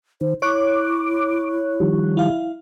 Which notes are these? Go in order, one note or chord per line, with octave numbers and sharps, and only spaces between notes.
D#3 C5
E4 C#5 C#6 D6 F#6
D#3 F3 G3
E4 F5